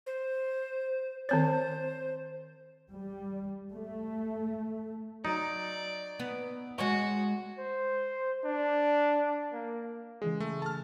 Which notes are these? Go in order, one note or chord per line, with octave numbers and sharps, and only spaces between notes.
C5
D#3 C4 C5 C#5
G3
A3
F#3 D#4 D5
B3
G#3 F#4 C#5 D#5 C#6
C5
D4
A#3
C#3 E3 G#3 G#4
A3
A5 F6